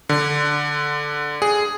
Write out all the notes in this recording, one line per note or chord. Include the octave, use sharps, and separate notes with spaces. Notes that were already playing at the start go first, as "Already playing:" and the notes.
D3
G#4